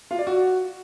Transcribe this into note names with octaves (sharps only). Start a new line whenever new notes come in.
F4
D5
F#4